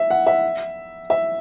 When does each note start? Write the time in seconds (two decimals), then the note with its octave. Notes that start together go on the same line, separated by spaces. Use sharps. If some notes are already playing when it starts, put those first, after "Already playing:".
Already playing: E5
0.10 F#5
0.27 E5
1.10 E5